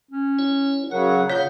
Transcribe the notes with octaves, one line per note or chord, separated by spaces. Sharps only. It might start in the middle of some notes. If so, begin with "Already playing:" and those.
C#4
E4 C#5
C#3 F#3 A#4 F#5
C#3 F4 C#5 G6